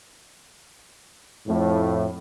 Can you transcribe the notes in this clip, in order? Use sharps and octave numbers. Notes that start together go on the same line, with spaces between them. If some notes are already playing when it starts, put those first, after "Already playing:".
F2 A2